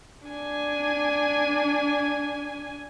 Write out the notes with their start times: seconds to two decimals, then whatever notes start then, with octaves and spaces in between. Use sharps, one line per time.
0.28 D4 G#5